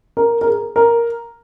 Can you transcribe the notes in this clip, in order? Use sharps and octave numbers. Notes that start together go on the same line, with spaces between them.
A#4
A#4
G#4
A#4